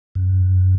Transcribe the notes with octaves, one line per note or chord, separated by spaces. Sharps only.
F#2